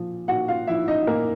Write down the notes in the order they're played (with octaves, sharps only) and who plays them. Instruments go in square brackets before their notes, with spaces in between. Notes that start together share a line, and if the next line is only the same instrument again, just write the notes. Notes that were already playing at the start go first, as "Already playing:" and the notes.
Already playing: [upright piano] A#2 F3
A#2 F#4 F#5
F4 F5
F3 E4 E5
D#4 D#5
A#2 A#3 A#4